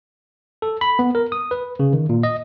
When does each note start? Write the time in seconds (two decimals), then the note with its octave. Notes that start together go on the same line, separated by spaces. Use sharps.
0.62 A4
0.81 B5
0.99 B3
1.15 A#4
1.32 D#6
1.51 B4
1.80 C#3
1.93 D#3
2.09 A#2
2.23 D#5